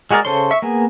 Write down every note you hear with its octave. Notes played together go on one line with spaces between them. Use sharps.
G#3 F#4 G#4 A#4 D5
C#3 A4 C5 C#5 C6
E5 C#6
A#3 B3 G#4